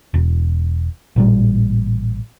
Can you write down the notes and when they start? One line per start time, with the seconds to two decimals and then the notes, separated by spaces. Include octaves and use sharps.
0.14 E1
1.16 A1 A#2 G3